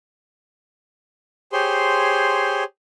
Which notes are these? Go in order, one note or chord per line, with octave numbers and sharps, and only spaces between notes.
G4 G#4 C5 C#5 C6